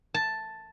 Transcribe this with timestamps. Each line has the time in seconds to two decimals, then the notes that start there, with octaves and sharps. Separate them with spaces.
0.14 A5